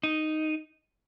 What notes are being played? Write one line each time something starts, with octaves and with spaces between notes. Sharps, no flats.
D#4